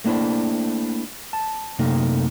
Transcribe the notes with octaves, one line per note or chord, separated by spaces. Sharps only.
A3 A#3 D4 E4 C5
A5
F#2 C3 A3 A#3 D#4